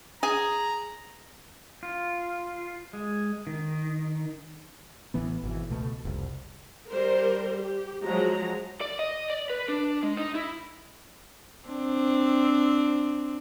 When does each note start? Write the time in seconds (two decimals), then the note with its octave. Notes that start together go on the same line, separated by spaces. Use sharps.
0.23 G#4 A#5
1.83 F4
2.93 G#3
3.47 D#3
5.14 A1 E3 B3
5.43 G#1 B2 E3
5.69 C#2 B2 A3
6.05 F1 C2
6.90 G3 A#4 C5
7.56 G4
8.04 F3 F#3 G#3 A#5
8.81 D5
8.99 D#5
9.30 D5
9.50 B4
9.68 D4
10.03 G#3
10.17 D#4
10.35 E4
11.68 C4 D4